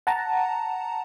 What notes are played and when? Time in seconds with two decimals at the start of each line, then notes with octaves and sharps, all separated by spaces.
0.07 F#5 A5 A#5